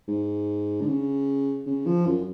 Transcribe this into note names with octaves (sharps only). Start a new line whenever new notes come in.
G#2
D3
C#3
C#3
F3
F#2